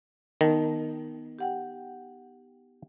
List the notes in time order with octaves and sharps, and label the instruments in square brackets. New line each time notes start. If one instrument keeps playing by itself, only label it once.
[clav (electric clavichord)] D#3 [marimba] B3 D#4 A5
[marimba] G4 F#5 G5